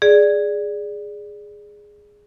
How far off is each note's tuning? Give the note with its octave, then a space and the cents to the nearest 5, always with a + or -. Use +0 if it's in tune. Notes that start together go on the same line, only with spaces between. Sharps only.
G#4 +0 D5 +0